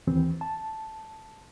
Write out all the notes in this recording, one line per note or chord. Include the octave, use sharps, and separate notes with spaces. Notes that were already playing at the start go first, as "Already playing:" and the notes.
D#2 E3 C4
A5